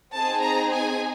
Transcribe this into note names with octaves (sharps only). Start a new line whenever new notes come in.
C4 D#4 G#4 A5
A#5
G#5